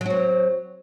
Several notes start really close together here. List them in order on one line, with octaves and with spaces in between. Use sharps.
F#3 F#4 C4